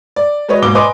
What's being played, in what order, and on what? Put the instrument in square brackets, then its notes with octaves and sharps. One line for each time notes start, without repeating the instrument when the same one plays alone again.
[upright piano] D5
G#3 F#4 B4 C#5 D#5
G#2 B2 A#3 D6 G7
B4 D#5 G#5 B5 C6 D6